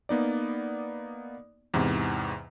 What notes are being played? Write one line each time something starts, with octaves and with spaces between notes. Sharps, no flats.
A#3 B3 D#4 D5
E2 G#2 C3 E3